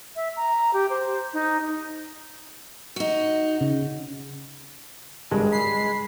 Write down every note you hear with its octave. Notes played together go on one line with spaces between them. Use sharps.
E5
A#5
G4
C5
D#4
D#4 F#4
C#3
G#1 C#2 G2 G#3
B5 C7